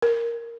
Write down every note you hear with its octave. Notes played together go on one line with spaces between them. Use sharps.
A#4